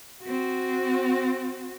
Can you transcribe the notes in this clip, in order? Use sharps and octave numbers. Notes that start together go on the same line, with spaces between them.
C4 F#4